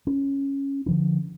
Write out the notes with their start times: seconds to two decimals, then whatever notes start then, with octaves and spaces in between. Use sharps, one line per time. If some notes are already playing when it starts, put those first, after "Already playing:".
0.07 C#4
0.86 D3 F3 D4